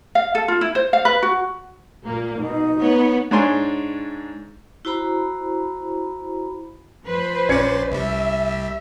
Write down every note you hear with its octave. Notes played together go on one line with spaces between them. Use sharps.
F5
A4
F4
E4
C5
F5
B4
F#4
A#2 A#3
B2 D#4
B3 C#5
G#2 G#3 D4 C#5 G#5 C6
E4 F#4 C5 A#5 B5
F3 B4 C5
A#1 C#4 D5 G#6 C#7
C2 G3 E5